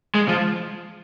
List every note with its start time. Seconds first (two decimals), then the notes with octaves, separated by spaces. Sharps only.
0.15 G#3
0.28 F3